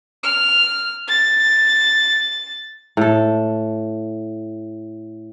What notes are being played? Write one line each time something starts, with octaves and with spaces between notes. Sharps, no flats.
F6
A6
A2 A4